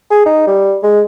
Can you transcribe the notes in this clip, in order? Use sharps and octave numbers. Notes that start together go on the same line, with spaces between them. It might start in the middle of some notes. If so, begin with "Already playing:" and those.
G#4
D#4
G3
G#3